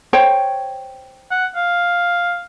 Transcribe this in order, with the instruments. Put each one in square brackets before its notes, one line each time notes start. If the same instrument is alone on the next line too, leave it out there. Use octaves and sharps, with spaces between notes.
[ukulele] C5 C#5 G5
[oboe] F#5
F5